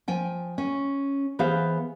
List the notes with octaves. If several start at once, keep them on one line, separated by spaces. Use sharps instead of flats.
F3 G5 G#5
C#4
E3 B3 G#4 C5 F5